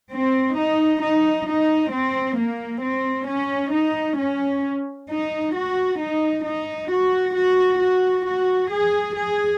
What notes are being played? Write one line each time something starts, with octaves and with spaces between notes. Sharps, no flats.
C4
D#4
D#4
D#4
C4
A#3
C4
C#4
D#4
C#4
D#4
F#4
D#4
D#4
F#4
F#4
F#4
F#4
G#4
G#4